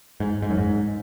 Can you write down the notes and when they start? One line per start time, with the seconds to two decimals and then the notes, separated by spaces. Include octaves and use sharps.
0.20 G#2
0.42 G#2
0.50 F#2
0.58 G#2